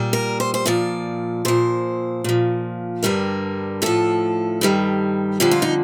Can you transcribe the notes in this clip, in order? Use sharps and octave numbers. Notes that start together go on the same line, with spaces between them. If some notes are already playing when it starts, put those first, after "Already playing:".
Already playing: A#2 G3
A#4
C5
C5
A#2 F3 D5
A#2 F3 C5
A#2 F3
G2 D3 G3 A#4
A2 F3 A4
G2 D#3 G3
F2 D3 F3 G4
F4
D#4